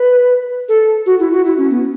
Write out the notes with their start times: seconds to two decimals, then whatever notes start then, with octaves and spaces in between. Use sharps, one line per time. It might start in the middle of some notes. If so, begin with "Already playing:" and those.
Already playing: B4
0.68 A4
1.06 F#4
1.19 E4
1.32 F#4
1.45 E4
1.58 C#4
1.70 B3